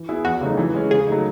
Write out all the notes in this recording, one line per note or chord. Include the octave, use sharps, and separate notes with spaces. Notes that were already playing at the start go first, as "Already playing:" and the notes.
Already playing: E3
B3 E4 G#4
E2 F#4
C#3 F#3 A3 D#4
E3
G#3 C#4
C#3 G#4
F#3 A3 D#4